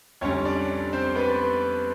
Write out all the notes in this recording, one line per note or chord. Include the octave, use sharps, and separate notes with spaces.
F2 D3 G3 C#4 C#5
D4 D5
C4 C5
B3 B4